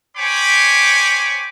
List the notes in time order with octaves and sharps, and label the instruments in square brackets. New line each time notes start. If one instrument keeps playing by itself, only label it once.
[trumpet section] C5 C#5 G5 G#5 B5 D6